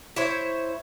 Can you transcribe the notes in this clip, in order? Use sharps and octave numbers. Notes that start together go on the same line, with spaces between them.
E4 C5 C#5